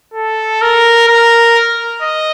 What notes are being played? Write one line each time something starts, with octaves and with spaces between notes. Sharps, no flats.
A4
A#4
A#4
D#5